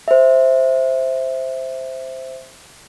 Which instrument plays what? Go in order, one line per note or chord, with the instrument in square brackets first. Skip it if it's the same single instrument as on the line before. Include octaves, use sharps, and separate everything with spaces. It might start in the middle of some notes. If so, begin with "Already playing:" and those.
[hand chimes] C5 E5